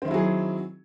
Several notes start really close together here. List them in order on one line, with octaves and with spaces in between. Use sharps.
C4 D#3 E4 F#3 G#4